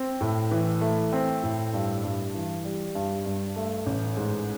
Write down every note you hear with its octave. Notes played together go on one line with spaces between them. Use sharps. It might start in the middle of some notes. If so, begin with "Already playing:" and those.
Already playing: C4
A2
E3
A3
C4
A2
G2
G2
E3
G3
G2
G2
A3
A1
G#2